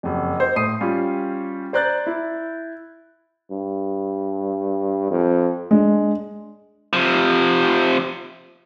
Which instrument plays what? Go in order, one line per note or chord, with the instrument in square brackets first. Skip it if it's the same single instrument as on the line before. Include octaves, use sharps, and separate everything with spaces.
[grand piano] F#1 F2
C5 D#5
A2 D#6 C7 D#7
G3 C#4 F4 G4
C5 D5 A#5 F#6 G6 A6
E4
[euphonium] G2
F2
[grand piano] G#3 [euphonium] D4
[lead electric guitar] C3 F3